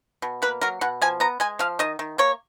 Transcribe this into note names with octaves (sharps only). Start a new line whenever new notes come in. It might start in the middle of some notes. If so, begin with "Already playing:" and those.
B2
A#3 B4
F#3 A#4
B2 F#5
F3 G#5
B3 A#5
G#3 G#5
F3 F5
D#3 D#5
D#3
A#3 C#5